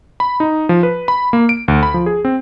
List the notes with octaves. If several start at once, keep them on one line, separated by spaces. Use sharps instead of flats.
B5
D#4
F3
B4
B5
A#3
D7
D2
B5
F3
G#4
C4